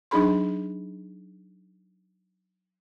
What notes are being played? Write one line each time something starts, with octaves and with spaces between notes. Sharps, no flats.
F#3 D4 D#4 G#4 B5 C6